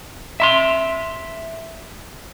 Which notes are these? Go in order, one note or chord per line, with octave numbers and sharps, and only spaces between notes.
E5 B5 C6